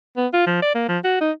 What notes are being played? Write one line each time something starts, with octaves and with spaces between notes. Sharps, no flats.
B3
F4
F3
D5
A#3
F3
F#4
D#4